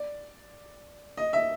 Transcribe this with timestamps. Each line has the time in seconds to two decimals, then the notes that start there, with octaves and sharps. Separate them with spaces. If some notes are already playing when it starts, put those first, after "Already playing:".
Already playing: D5
1.17 D#5
1.33 E5